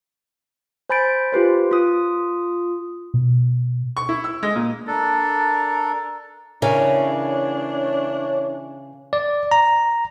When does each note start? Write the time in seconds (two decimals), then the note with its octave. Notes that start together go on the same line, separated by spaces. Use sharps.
0.90 C5 G#5 B5 G6 A6 D7
1.33 F4 G4 B4 C5
1.71 F4 D#6
3.14 B2
3.97 C#6
4.09 E4
4.24 E6
4.43 G#3
4.56 A#2
4.87 D4 A4 A#4
6.62 C#3 E3 D4 A#4 C#5
9.13 D5
9.51 A#5